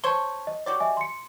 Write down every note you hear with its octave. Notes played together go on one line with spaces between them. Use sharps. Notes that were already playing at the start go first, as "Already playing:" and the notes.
C5 C#5 A5 G7
D#5
F#4 G4 C#5 D5
D#5 E5 G#5
C6 C#7